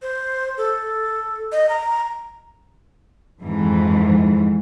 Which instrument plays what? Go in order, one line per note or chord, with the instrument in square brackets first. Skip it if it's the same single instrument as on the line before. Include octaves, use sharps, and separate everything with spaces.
[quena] C5
A4
D#5
A#5
[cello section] F2 G#2 E3